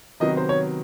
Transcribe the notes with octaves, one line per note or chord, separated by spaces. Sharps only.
C3 D#3 F#3 B3 D#5
C5
C#5